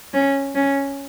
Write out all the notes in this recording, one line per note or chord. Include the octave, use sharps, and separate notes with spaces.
C#4
C#4